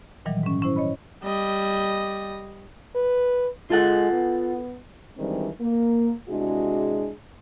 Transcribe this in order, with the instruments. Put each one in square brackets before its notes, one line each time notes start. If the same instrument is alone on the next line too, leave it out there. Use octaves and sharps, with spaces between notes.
[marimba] A#2 D#3 E3 F#3 G3
G#2 C#4
C#4 E4 C5
C#5 D#5 B5
[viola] G3 D#5
[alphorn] B4
[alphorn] G#3 [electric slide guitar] F4 A4 F#5
[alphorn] B3
[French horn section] D#3 E3 G3 G#3 C4 D4
A#3
C3 G#3 D4 E4 F#4 G#4